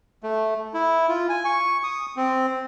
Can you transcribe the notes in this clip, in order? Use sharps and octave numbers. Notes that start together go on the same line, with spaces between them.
A3
E4
F4
G#5
C#6
D#6
C4